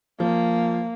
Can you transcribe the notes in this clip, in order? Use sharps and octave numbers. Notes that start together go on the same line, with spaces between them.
F3 A#3